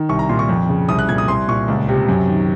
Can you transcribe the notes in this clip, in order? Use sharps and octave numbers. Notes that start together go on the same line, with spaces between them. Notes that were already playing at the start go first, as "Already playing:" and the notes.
Already playing: D#3
C2 C#6
A#5
A#2 C6
C#6
F2
C#3
C2 D#6
F#6
A#2 G#6
D#6
C2 C6
A#2 C#6
C#2
C3
F#2
D#3